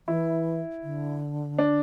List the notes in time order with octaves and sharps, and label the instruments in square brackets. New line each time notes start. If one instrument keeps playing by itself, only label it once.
[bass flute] E3 [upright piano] E4
[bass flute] D3
[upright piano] D4